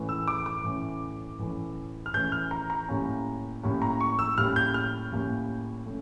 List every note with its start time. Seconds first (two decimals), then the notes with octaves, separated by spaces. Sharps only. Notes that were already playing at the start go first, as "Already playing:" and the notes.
Already playing: A2 E3 A3 C#4
0.09 E6
0.28 D6
0.46 D6
0.64 A2 E3 A3 C#4
1.39 A2 E3 A3 C#4
2.06 F6
2.13 A2 E3 A3 C#4 G6
2.32 F6
2.51 A#5
2.70 A#5
2.89 A2 G3 A#3 C#4
3.63 A2 G3 A#3 C#4
3.82 A#5
4.01 C#6
4.19 E6
4.38 A2 G3 A#3 C#4 F6
4.56 G6
4.74 F6
5.12 A2 G3 A#3 C#4
5.86 A3 C#4